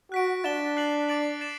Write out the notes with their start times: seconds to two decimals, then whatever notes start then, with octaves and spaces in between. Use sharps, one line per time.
0.12 F#4 F#6 B6 D7
0.44 D4 A6 E7 G7
0.77 F#6 C7 F#7
1.09 D6 A6 D7 F#7
1.41 A6 C7 E7